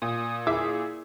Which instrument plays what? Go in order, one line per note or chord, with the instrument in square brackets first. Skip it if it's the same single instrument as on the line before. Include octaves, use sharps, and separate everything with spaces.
[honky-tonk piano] A#2 [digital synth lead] D#6
[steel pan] E4 [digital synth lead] G#4 [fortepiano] E5 D6 E6